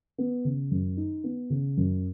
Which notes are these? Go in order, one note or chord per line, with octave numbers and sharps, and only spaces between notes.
B3
C#3
F#2
D#4
B3
C#3
F#2